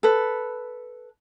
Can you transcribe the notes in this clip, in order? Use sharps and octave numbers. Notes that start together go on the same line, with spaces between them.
A4 B4